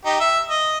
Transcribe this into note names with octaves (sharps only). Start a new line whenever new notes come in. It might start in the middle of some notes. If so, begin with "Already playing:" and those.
D#4 G4
E5
D#5